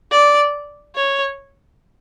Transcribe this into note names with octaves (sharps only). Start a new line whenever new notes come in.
D5
C#5